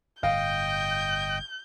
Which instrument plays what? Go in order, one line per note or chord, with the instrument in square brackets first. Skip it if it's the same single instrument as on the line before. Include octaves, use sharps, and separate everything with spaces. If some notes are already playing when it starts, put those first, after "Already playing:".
[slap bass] G1 A2 [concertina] D#5 G5 [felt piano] F5 [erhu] G6